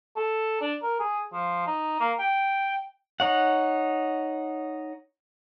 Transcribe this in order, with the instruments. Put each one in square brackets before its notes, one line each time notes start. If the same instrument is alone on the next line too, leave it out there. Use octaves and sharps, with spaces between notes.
[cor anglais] A4
D4
A#4
G#4
F3
D#4
A#3
G5
[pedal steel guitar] D#4 C#5 F#5